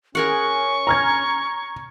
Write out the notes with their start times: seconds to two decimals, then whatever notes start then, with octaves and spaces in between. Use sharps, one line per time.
0.15 C#4 G#4 A#4 F#5 C#6
0.87 A#5 F6 G#6